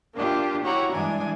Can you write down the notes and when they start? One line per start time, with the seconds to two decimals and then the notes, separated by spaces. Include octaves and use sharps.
0.13 A#3 D4 F4 G4
0.63 E4 F#4 G4 C#5 F#5 A#5
0.92 G2 E3 G#3 D4 G#5